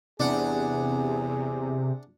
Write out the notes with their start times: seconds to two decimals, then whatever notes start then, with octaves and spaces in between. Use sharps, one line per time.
0.20 E2 C3 D4 G#4 F#5